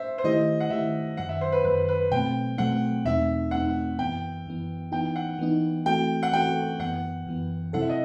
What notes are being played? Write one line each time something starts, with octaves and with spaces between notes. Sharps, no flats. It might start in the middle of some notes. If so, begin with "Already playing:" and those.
Already playing: C5 E5
C5
D#3 A3 E4 G4 D#5
F#5
D#3 A3 E4 G4 E5
F#2 D#3 F#3 F#5
E5
C5
B4
F#2 D#3 F#3 B4
B4
B2 F#3 A3 C4 G5
B2 F#3 A3 C4 F#5
E2 B2 A3 C4 D#4 E5
E2 B2 A3 C4 D#4 F#5
F#2 E3 B3 G5
F#2 E3 B3
E3 B3 D#4 G5
F#5
E3 B3 D#4
E3 A3 C4 F#4 A4 G5
F#5
E3 A3 C4 F#4 A4 G5
F#2 E3 B3 F#5
F#2 E3 B3
C3 F#3 C4 E4 A4 F#5
E5
D#5